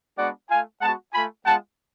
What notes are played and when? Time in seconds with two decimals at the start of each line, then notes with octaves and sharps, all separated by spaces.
0.18 G#3 B3 D4 F#4 D5 F#5
0.49 A3 F4 F5 G#5
0.81 G#3 B3 F#4 F#5 A5
1.13 A3 F4 G#5 B5
1.45 G#3 B3 F4 F#5 A5